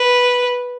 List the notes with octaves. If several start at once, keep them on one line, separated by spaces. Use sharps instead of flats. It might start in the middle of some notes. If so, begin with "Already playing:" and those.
Already playing: B4